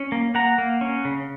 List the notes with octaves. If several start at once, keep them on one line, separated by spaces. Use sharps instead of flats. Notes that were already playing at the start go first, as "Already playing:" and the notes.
Already playing: C#4
A#3
A#3 F#5 A#5
A#3
C#4
C#3